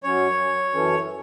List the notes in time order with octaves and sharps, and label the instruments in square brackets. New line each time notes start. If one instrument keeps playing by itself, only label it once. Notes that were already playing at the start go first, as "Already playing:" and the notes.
[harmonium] F#2 F#3 C#4 [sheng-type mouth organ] C#5
[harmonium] F#2 E3 C#4 A4